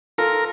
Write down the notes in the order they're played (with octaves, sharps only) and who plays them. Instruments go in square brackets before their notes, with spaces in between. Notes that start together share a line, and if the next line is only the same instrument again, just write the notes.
[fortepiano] F4 A4 [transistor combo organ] A#4